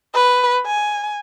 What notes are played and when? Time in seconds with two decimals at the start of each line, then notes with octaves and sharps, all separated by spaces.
0.14 B4
0.66 G#5